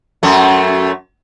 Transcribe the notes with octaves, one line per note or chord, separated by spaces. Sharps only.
F#2 A3